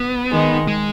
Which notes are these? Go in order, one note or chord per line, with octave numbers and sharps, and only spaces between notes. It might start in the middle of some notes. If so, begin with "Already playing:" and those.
Already playing: B3
D#3 G#3 D#4
G#3